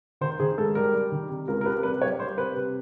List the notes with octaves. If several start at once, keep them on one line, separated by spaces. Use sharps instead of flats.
D#3 C5
D#3 G#4
G#2 A4
G3 A#4
G3
D#3
C3
C#2 A#4
A#4
C3 B4
G3 B4
G3 C#5
G3 C5
C3 B4
C3